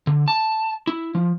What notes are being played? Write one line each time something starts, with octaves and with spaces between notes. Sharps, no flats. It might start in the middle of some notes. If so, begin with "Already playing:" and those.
D3
A5
E4
F3